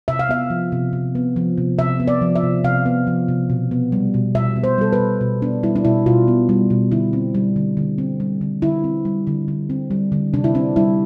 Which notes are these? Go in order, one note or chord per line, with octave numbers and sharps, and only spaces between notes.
C3 E5
F5
B3 E5
F3
C3
C3
B3
F3
C3
C3 E5
B3
D5
F3
E5
C3
C3 F5
B3
F3
C3
B2
B3
G3
B2
B2 E5
B3
C5
G3 A4
B4
B2
B2
B3 D4
G3 E4
D4
B2 E4
B2 F4
B3
G3
B2
D3 E4
C4
G3
D3
D3
C4
G3
D3
D3 E4
C4
G3
D3
D3
C4
G3
D3
C3 D4
E4
C4 D4
G3 E4